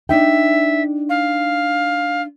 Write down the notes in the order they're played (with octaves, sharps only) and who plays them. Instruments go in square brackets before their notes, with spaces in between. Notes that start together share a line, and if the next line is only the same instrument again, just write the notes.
[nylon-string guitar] D4 D#4 G5 [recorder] E5
[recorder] F5